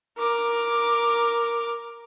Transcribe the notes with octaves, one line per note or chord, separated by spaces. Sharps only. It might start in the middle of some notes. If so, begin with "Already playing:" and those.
A#4 D6